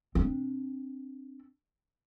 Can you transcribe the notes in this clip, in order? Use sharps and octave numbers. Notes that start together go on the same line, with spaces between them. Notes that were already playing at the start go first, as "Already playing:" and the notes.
C4 D4